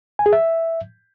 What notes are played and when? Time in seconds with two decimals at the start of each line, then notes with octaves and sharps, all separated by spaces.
0.19 G#5
0.26 G#4
0.33 E5